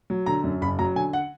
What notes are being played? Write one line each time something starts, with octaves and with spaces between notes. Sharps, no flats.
F#3
D3 A#5
F#2
F#1 B5
F#3 A#5
D3 G#5
F#5